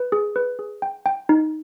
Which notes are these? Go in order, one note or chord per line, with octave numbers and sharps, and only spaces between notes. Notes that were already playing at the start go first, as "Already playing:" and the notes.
Already playing: B4
G#4
B4
G#4
G5
G5
D#4